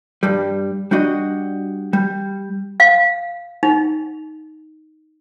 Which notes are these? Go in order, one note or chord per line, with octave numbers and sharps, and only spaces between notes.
G2 G3
G3 D4 F#4 D#5
G3
F5
D#4